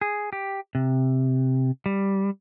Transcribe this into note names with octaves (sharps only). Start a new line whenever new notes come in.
G#4
G4
C3
G3